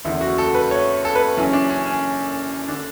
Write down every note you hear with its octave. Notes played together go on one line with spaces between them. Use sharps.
F#1 E2 D3 E4
F#4
A4
B4
C#5
A4
B4
F#1 F#2 E3 C#4
D4
C#4
C#4
D3 D4